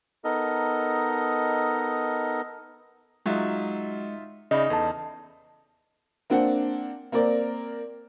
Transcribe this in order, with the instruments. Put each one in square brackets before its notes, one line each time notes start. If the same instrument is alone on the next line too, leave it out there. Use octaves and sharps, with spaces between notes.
[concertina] B3 D#4 A4 A#4 D#5
[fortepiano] F#3 [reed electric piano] G#3 D#5 [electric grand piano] D#4 F4 E5
[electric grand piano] C#3 [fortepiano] D#4 [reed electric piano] D5 E5 B5
[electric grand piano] E2 [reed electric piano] A4 A5
[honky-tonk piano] A#3 C4 D4 F#5
A#3 C4 A#4 D5